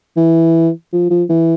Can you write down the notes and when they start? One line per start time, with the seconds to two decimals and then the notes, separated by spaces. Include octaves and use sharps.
0.17 E3
0.93 F3
1.10 F3
1.29 E3